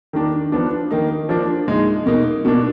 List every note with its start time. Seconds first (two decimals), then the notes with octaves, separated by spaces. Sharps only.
0.13 D#3 A#3 D4
0.52 F3 B3 D4
0.91 D#3 A#3 D#4
1.29 F3 A#3 D4
1.68 A#2 G#3 D#4
2.06 B2 A#3 D#4
2.45 B2 A#3 D4